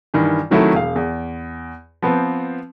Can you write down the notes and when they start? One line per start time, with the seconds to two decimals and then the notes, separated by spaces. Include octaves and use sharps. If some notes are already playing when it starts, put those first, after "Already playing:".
0.14 G2 D#3 E3
0.51 C3 D#3 F#3 A3 E4
0.74 E1 F5
0.96 E2
2.02 F3 B3 C4 B4